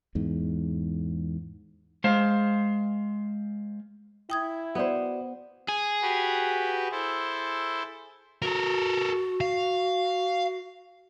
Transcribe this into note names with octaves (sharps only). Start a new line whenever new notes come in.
E2 G#2
G#3 C5 F5
E4 G5 D#6 G#6
B3 F#4 C5 D5
G#4
F#4 G4 B4
E4 A4 C5
F#4 A4 A#4
F5